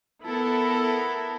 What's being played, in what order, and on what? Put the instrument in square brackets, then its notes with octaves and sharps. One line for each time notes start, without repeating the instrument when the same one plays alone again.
[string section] B3 E4 A4 A#4